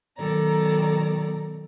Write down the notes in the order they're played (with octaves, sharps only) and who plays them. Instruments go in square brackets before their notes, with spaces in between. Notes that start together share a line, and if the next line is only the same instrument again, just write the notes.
[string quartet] B2 D#3 F#3 A4 D5 A#5